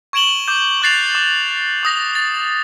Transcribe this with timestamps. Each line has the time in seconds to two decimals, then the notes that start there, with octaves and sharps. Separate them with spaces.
0.13 C#6 G#6 D7 E7 F#7 G7
0.48 D6 G6
0.82 C#6 F#6 A6 C7 F7
1.15 D6
1.83 D6 D#6 A#6
2.15 A6